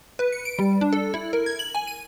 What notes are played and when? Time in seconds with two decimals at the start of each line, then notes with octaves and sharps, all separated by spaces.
0.19 B4
0.32 C#7
0.45 D7
0.59 G3
0.81 D4
0.93 A4
1.14 E4
1.33 A#4
1.46 G#6
1.59 F#7
1.75 G#5
1.87 D#7